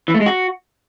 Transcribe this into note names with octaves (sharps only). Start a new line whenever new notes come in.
E3
A3
G#3
F#4